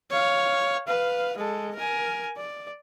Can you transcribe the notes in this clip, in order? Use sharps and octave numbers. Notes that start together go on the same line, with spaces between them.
C#5 F5
B4 F5
G#3 A4
A#4 G#5
D5